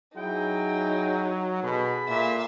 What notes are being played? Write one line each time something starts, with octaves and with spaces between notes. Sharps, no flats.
F#3 D#4 E4 G#4 G5
B2 G#4 A4 B5
A#2 E5 F5